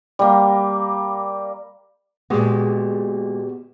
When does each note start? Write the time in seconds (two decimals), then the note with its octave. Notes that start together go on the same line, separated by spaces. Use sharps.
0.19 G3 A#3
2.30 A#2 G#3 B3 F#4 G4